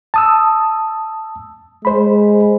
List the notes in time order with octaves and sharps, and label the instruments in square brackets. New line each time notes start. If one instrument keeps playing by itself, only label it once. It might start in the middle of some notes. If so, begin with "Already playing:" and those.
[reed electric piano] A5 D#6 E6
[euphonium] G#3 [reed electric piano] C5 B5